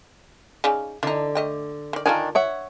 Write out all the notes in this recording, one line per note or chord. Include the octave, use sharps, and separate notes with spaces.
C#3 D#4 D5
D3 E3 D#4
A3 D#5 G5
D#3 D5
D#3 D4 F4 A4 A#4 G#5
C#5 E5 F#5